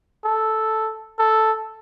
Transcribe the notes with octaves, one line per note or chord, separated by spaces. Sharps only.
A4
A4